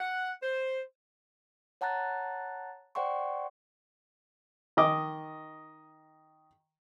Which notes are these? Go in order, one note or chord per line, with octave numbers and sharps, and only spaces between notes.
F#5
C5
C#5 F#5 A5 A#5 F#6 A6
C5 D5 F#5 G5 C6 C#6
D#3 D#5 D6